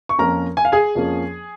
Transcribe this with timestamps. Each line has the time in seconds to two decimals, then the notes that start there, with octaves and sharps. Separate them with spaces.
0.09 C#6
0.19 F2 F3 A#3 C#4 A#4 A#5
0.57 G#5
0.65 F5
0.72 G#4 G#5
0.95 F2 F3 A#3 C#4